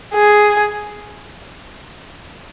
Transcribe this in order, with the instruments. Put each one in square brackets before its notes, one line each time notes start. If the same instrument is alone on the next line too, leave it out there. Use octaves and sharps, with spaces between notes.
[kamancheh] G#4